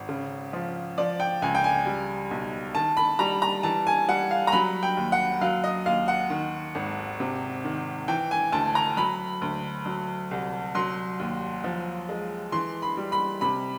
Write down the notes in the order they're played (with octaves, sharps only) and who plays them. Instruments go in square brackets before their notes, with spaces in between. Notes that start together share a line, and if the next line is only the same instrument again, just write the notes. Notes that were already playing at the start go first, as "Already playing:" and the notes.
Already playing: [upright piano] G#1
C#3
F3
F3 D5
G5
C#2 G#5
G5
G#5
G3
B1
D#3 A5
B5
G3 A#5
A#5
E3 A5
G#5
G3 F#5
F5
A#5
F#3 B5
G5
D#2
F#5
F#3 F5
D#5
D#2 F5
F#5
D#3
G#1
C3
D#3
E3 G5
G#5
D2 A5
A#5
F#3 B5
D2
F#3
C2
F#3 C6
D#2
F3
G#3
E3 C6
B5
G3
B5
C3 B5